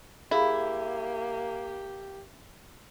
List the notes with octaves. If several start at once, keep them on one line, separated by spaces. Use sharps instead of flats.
A#3 E4 G4 G#4 F5 B5